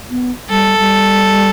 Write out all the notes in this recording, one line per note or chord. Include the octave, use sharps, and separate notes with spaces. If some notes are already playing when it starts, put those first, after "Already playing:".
B3
G3 A4
G3